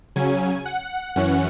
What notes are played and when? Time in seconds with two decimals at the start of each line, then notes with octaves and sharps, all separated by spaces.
0.16 C#3 F#3 C#4 G#5
0.66 F#5
1.16 F#2 E3 C#4 F#5